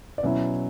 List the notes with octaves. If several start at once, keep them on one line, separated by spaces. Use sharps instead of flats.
D5
B2 F#3 C#4 E4 E5